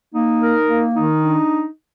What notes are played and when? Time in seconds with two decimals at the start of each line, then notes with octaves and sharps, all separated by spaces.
0.14 A#3 D#4
0.42 A#4
0.68 A#3
0.95 D#3 D#4
1.23 D4